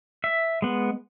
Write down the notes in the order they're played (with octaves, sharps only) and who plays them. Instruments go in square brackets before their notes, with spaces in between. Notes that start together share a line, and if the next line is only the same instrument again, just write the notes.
[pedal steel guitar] E5
G#3 B3